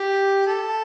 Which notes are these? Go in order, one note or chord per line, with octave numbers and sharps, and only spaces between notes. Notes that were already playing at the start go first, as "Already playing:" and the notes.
Already playing: G4
A4